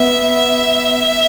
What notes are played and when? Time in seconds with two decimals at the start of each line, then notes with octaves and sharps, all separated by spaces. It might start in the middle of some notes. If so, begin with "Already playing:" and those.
Already playing: B3 E5
0.32 E5